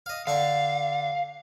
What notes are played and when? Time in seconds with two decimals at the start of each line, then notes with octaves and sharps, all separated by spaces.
0.06 D#5 F5
0.27 D3 D4 F5 C#6